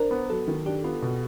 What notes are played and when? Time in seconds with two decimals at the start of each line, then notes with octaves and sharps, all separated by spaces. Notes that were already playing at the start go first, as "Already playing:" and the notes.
Already playing: D4 A#4 C5
0.11 B3
0.30 F#3 A4
0.48 D#3
0.66 D4 G4
0.84 B3 F4
1.02 B2